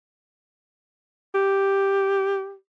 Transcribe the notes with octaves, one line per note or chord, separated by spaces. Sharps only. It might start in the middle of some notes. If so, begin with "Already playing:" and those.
G4